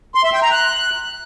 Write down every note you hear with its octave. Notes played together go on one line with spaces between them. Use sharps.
C6
E5
G5
A#5
F#6